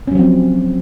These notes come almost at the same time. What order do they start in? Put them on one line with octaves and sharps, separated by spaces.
C#4 F#3 F3 C4